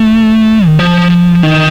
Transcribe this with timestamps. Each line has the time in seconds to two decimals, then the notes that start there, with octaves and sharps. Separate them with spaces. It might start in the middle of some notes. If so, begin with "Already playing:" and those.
Already playing: A3
0.66 D#3
0.79 F3
1.43 D#3